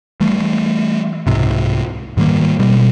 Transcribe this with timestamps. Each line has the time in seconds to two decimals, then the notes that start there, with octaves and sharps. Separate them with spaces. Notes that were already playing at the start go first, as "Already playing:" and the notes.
0.21 E3 G3 A3
1.27 C2 G#2 C3
2.17 G#2 D#3 G3 A#3
2.59 B2 G3